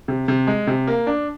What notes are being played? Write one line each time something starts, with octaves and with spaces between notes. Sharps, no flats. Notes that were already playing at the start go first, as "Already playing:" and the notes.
C3
C3
G#3
C3
A#3
D4